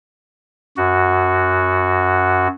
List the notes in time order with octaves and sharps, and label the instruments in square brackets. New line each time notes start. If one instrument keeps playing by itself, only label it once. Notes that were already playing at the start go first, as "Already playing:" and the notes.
[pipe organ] F#2 F#4